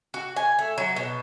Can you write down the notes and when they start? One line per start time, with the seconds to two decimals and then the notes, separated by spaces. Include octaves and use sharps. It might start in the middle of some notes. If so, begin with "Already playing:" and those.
0.14 F#4
0.36 G#5
0.59 A3
0.78 F#3
0.96 B2